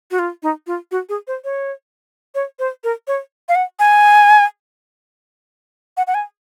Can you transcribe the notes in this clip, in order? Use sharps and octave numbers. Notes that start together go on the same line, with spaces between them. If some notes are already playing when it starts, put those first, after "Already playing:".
F#4
F4
D#4
F4
F#4
G#4
C5
C#5
C#5
C5
A#4
C#5
F5
F#5
G#5
F#5
F#5
G#5